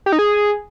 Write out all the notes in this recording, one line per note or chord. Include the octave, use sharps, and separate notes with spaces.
G4
D#4
G#4